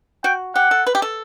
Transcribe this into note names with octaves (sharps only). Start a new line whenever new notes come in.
F#4 G5
G4 F#5
A4
B4
G4
A4